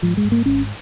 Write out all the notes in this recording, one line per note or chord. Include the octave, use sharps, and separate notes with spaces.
G#2 F3
G#3
G#2
A#3
G#1 C#4